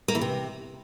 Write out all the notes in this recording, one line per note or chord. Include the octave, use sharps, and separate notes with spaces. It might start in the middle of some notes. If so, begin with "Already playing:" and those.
A#3
E3
C3